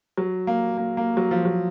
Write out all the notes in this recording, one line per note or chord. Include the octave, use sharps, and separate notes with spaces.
F#3
A#3
A#3
A#3
F#3
F3
F#3